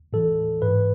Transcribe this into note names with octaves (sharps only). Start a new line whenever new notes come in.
A2 E3 A4
G#2 E3 B4